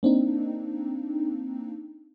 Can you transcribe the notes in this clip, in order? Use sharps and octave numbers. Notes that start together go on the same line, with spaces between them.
A#3 C4 D4 D#4